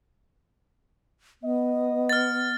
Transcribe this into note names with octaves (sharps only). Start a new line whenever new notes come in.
B3 D#5
F6 A6